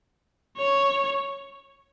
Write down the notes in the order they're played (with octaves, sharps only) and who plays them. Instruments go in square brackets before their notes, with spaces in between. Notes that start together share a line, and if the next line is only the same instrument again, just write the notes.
[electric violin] C#5